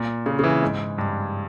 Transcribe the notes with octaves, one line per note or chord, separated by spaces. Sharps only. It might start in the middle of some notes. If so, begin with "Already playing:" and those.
Already playing: A#2
C#3
C#3
E3
G#2
G2